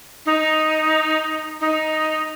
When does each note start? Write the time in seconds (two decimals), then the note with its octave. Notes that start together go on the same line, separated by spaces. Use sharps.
0.26 D#4
1.61 D#4